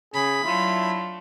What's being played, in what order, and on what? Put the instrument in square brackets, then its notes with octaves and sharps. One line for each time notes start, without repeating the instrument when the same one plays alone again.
[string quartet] C#3 [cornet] G#4 [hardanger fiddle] B5
[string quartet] F#3 A3 D4 [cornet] E4 [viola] F4